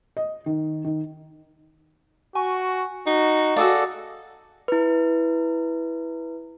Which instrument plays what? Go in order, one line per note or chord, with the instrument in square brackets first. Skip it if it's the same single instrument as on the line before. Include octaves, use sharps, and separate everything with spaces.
[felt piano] D#5
D#3
D#3
[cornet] F#4 [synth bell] G#5 C#6
[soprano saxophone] D#4 [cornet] F#4
[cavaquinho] F#4 G#4 D5 [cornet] A4 [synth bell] F5 D#6 E6
[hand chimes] E4 B4